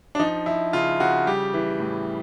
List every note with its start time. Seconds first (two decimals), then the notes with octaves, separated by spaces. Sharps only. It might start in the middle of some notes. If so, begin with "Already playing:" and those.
0.15 D4
0.19 F3 D#4
0.46 F3 E4
0.73 C#3 F4
1.00 C#3 F#4
1.27 G3 G4
1.54 E3
1.80 A2